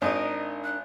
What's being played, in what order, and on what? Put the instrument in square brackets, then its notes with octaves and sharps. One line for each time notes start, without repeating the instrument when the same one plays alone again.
[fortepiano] G#1 [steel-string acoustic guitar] D4 D#4 A#4 [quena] D#5
[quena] F#6